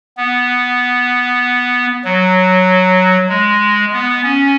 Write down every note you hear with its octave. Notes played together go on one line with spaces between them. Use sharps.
B3
F#3
G#3
B3
C#4